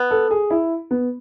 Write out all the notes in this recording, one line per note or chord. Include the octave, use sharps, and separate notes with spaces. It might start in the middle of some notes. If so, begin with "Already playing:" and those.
Already playing: B3 B4
A4
G#4
E4
B3